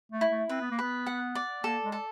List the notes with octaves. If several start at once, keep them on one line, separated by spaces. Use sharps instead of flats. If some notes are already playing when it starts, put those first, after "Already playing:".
A3
E4
A3
C4 B4
B3
A#3
B3 B4
F#5
D5
A#3 A4
G#3
A4